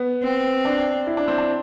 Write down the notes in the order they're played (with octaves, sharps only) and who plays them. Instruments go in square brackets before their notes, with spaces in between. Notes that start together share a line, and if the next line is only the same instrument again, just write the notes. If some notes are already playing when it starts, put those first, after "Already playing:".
Already playing: [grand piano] B3
[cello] C4
[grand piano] D4
E4
D4
C4
D4